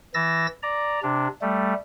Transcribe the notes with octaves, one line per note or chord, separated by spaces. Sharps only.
E3 E6 A6 A#6
D5 A#5
C3 D4
G3 A3